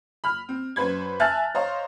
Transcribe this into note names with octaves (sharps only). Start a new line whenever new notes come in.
B5 F6
C4
F#2 B4 C5 B5 G#6
E5 G#5 A5 F6 F#6 A6
C5 C#5 D#5 F5 A#5 C6